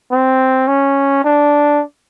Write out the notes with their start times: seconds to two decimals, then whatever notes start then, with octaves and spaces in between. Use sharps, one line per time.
0.11 C4
0.68 C#4
1.24 D4